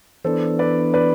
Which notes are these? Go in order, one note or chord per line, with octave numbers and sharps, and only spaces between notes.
E3 B3 D4 A4 C5
B4 D5
B4 D5